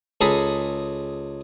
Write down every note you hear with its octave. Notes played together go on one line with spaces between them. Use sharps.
C#2 G#4 A4 A#5 B5